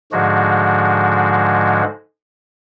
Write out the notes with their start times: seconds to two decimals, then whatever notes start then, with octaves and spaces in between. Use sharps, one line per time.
0.12 G#2 D3 F3 G#3 F#4